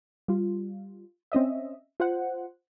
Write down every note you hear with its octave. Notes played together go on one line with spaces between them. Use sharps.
G3 F4
C4 C#4 D#5 E5
F4 C5 F#5